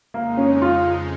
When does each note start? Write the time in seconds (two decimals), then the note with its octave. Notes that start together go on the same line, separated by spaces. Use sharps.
0.14 F2 C#3 G#3 A#3 D#4
0.37 C#4
0.62 F4